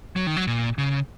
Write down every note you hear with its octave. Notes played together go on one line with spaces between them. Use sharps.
F#3
D#3
F#3
A#2
C#3